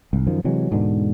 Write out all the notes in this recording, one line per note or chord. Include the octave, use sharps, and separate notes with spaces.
C2 G#2
F#2 D#3 F3
C3 E3 F#3 G#3
E1 G#2 B2 D3